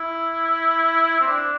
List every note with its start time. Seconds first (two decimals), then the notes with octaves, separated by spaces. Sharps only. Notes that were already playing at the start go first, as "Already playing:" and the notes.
Already playing: E4
1.20 C4
1.27 D4